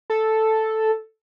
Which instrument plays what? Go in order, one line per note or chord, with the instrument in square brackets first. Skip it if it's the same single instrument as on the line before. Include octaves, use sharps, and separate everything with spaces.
[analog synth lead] A4